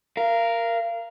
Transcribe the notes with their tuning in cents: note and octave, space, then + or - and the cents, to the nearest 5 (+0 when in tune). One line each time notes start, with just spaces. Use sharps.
A#4 +0 F5 -30